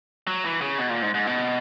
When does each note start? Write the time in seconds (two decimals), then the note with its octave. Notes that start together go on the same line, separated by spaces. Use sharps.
0.27 F#3
0.45 E3
0.61 C#3
0.78 B2
0.90 A#2
1.02 G#2
1.14 G#2
1.27 B2